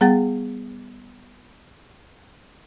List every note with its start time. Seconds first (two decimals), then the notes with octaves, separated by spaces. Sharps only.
0.01 G3 B3 G#4 F#5 G5 A6